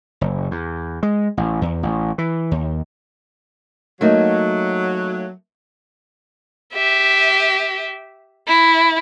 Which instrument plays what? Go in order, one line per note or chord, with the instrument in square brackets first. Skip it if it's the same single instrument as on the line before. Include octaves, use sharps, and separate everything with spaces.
[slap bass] F#1
E2
G#3
A1
E2
A1
E3
D#2
[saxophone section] F#3 [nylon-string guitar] A3 A#3 D#4
[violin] G4 E5
E4